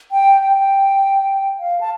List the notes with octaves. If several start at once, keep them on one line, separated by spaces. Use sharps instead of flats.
G5
G5
F5
A5